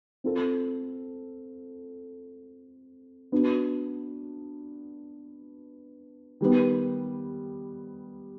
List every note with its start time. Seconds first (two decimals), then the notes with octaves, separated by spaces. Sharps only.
0.24 C4 F4 A4
3.32 B3 D4 F#4
6.41 D#3 G3 B3